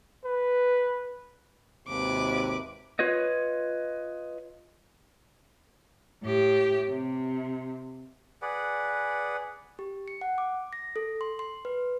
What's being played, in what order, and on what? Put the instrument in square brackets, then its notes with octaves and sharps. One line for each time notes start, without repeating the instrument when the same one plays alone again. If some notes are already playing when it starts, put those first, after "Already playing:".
[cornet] B4
[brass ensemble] G#1 D#2 C3 [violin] B4 D6
[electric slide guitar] F4 B4 C#5 D#5
[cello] A2 G4
C3
[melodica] G#4 B4 D5 F#5
[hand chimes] G4
C#7
F#5
D6
A#6
A4
C6
C6
B4